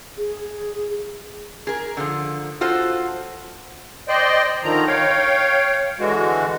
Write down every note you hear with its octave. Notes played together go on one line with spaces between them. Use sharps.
G#4
G#4 A#4
D3 F3
F4 F#4 A4 C5
C5 D5 D#5 G5
D3 D#3 F3 A#5
C#5 F5 G5
D3 E3 G#3 F#4